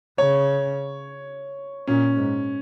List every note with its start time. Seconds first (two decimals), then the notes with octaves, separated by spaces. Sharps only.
0.18 C#3 C#5
1.87 A#2 C#4
2.16 G#2